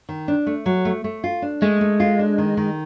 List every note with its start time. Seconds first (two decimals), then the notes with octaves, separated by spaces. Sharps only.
0.09 D#3
0.28 D4
0.46 A3
0.66 F#3
0.85 A3
1.04 A3
1.24 F4
1.42 D4
1.62 G#3 A3
1.81 A3
2.00 F4
2.19 D4
2.38 D#3
2.57 D#3